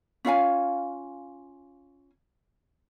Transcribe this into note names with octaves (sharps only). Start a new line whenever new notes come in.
C#4 F4 F5 G#5